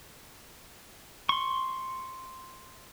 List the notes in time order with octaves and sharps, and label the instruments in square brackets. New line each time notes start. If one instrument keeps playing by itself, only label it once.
[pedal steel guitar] C6 C#6